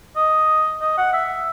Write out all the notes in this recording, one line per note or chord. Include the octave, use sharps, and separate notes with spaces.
D#5
D#5
F#5
E5